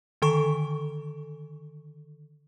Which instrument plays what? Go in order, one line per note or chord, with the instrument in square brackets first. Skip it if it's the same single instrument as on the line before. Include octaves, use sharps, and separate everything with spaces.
[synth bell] D3 D#3 A4 C#6